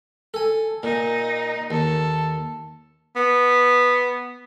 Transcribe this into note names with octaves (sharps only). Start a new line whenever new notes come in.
A4 G#5
A#2 D#4
D#2 A4
B3